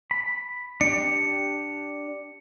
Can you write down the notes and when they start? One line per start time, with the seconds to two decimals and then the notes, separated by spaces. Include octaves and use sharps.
0.11 B5
0.81 D4 G4 C#7